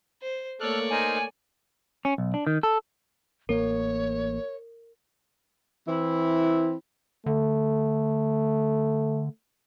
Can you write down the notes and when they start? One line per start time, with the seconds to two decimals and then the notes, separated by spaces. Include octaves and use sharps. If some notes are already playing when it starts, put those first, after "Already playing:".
0.22 C5
0.60 A3 A#3 A4 C#5 D5 F6 F#6
0.91 D#4 A#4 C5 G#5
2.05 C#4
2.18 B1
2.34 D4
2.47 D#3
2.63 A4
3.49 A1 A#3 A#4 C#5
5.88 E3 C4 E4
7.26 D3 A3